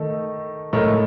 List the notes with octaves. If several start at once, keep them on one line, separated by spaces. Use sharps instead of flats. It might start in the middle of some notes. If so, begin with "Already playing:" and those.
Already playing: D#3 A3 D#4 A4
A2 A3 D#4 A#4